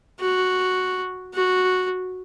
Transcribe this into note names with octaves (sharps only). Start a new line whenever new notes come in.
F#4
F#4